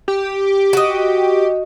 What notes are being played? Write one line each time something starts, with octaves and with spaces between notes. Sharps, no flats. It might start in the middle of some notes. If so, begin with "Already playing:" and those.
G4
F#4 D#5